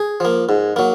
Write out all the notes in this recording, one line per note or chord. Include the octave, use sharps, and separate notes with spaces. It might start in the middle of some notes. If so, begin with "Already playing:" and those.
Already playing: G#4
F3 A#3
G#2
F#3 A#3